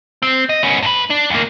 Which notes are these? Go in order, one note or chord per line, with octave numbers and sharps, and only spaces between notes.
C4
D#5
B3 C#4
G2 B4
D4
D2 A#3